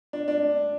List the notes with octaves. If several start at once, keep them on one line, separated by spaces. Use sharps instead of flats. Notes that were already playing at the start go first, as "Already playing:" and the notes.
D4
D4